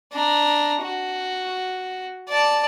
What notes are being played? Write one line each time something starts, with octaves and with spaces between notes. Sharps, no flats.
D4 A#5
F#4
D5 A5